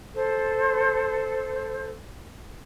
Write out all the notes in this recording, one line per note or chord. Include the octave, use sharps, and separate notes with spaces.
A4 C5